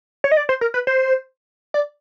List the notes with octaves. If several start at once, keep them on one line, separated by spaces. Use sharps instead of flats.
C#5
D#5
D5
C5
A#4
B4
C5
D5